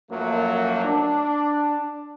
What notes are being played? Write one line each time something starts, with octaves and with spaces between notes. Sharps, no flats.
F#2 F3 F#3 A3 A#3
D4